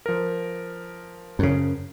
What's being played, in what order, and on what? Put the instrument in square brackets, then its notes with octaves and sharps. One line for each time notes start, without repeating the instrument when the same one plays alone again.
[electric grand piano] F3 A#4
[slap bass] F#2 C#3